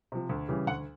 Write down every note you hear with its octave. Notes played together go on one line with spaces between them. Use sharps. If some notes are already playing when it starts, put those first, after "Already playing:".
C3 F3
D2
C#3 E3 G3
D2 F#5